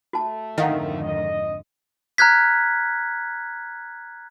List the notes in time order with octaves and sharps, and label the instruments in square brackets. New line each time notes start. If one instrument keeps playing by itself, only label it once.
[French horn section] A3 [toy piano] F#4 A5
[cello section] F2 G#2 D3 [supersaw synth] D#3 [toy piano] E4 F5 F#5
[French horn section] D#5
[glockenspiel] A#5 F6 F#6 G#6 B6